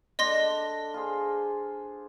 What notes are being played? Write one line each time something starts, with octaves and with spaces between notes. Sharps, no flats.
D4 A4 D#5 C6 A#6
F4 G#4 C5